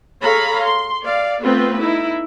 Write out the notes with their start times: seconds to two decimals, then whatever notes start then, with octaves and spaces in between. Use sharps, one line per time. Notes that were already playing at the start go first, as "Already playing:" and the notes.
0.22 G#4 A4 C#5 F5 A#5 B5
0.64 C6
1.03 D5 F5
1.42 A3 B3 C4 F4 B4
1.79 D#4 E4